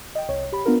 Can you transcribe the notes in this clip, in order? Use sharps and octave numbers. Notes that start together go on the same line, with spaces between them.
D#5 G5
C2 C#5
G4 B5
B3 D4 F4 A#4